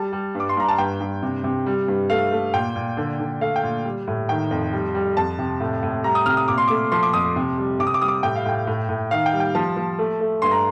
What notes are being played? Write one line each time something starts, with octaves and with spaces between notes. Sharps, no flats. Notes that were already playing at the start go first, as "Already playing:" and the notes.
Already playing: G3 A5
G3
G2
D6
C6
G2 A#5
A5
G2 G5
G2
C3
C3
G3
G2
A3 F5
A3
A#2 G5
A#2
D3
D3
A3 F5
G5
A#2
G3
A2
D#3 G5
F2
G3
G3
F2 A5
C3
A2
A2
G3 A#5
D#6
C3 F6
D#6
A#2 D6
C6
A3 D6
F3 C6
D6
F2 D#6
C3
G3
C3 D6
D#6
D6
G3 D#6
D6
A2 G5
F5
A2 G5
A2
A2
D#3 F5
G5
G3
G5
F3 A5
F3
A3
A3
G2 C6
A#5